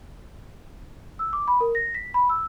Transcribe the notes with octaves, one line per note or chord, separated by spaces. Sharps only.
E6
D6
B5
A#4
A#6
B6
B5
E6